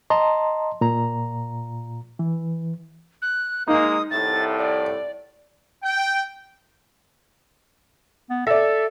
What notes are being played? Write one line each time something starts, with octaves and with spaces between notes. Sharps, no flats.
D#5 A5 A#5 C6
A#2 A#5
E3
F#6
G#3 A#3 D#4 D#6
C2 A2 A6
D5
G5
B3
A4 D5 E5